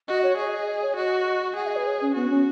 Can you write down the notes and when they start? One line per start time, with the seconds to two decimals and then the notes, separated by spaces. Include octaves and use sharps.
0.08 F#4 D#5
0.23 C#5
0.37 G#4 D#5
0.52 D#5
0.67 D#5
0.82 C#5
0.96 F#4 D#5
1.56 G#4 F#5
1.66 D#5
1.76 B4
1.86 C#5
2.01 C#4
2.15 B3 F#4
2.30 C#4